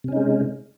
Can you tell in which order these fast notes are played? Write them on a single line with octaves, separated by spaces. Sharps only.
C3 C#4 D#4 G#3